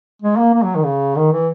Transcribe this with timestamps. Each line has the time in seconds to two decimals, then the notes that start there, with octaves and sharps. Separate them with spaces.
0.22 G#3
0.38 A#3
0.54 A#3
0.63 F#3
0.75 D#3
0.84 C#3
1.16 D#3
1.32 E3